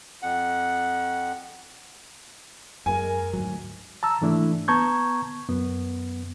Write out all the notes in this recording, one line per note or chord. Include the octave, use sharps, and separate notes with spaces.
F2 F#5
F#2 G#3 A#4 G#5
D2 G#2 F#3
A5 A#5 E6
G#2 E3 A3 D4 E4
B3 A5 A#5 C#6 G6 G#6
F#2 B3